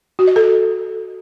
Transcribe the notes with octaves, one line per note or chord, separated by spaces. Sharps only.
F#4
D#5
A4